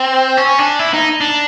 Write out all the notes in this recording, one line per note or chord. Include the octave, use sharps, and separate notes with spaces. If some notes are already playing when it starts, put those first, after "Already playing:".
Already playing: C4
C#4
D4
E4
D#4
D4